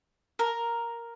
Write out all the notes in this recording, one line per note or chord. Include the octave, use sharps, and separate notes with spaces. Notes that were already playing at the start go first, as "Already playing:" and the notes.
A#4